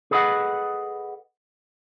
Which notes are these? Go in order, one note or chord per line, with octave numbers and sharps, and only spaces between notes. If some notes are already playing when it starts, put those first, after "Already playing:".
G#4 A4 B4 D#5 F5 F#5